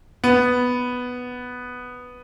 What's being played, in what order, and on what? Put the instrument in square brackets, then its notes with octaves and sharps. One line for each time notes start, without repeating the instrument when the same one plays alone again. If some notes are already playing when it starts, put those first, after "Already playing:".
[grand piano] B3